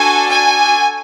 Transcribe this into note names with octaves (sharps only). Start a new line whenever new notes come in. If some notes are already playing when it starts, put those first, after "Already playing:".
Already playing: D4 F#4 A4 G#5
G#5